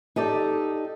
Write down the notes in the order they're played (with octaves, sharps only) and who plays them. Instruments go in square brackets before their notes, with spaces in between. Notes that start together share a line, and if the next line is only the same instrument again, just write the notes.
[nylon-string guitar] D#4 G4 A4 D5